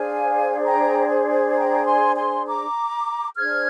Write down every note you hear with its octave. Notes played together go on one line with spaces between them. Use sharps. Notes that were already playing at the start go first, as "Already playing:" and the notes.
Already playing: D4 G#4 C5 F5 G#5
G5 A#5
G5 A#5
G#5 C6
G#5 C6
A#5 D6
D4 G#4 C5 F6 G#6